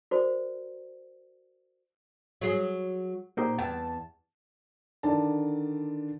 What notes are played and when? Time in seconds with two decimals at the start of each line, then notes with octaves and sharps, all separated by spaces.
0.11 F#4 A#4 C5 D5
2.41 F#3 G#4
3.37 A#2 D#4 G4 C5
3.58 E2 G5 A5
5.03 D3 D#3 D5 A5